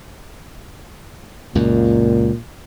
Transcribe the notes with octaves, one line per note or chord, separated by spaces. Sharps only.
C#2 F#2 A#2